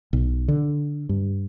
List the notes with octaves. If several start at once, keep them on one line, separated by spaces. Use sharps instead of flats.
B1
D3
G2